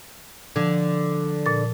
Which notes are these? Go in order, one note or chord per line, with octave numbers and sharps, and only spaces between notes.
D3 F3
A#2 A6